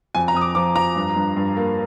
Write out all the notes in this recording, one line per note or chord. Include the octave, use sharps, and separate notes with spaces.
F2 G#5
A#5
F2 D#6
D6
F3 D6
F3 A#5
G2
G2
G2
A#3